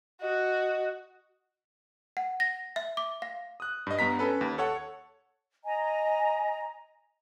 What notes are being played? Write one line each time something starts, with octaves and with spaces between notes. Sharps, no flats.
F#4 D#5
F#5
A#6
E5
D6
F5
D#6 F#6
G2 D#5
G2 B3 A#5 B6
C#4 A4 B4
D#2
A4 C#5 F#5
D#5 G#5 A#5